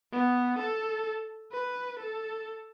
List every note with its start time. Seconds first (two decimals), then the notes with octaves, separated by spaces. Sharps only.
0.13 B3
0.58 A4
1.52 B4
1.99 A4